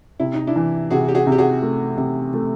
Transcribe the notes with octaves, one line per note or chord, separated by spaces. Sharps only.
C3 E4
D#4
D4 E4
E3
C3 F#4 G#4
G4
F#4 G#4
C3
G4
F#4 G#4
A3
C3
A3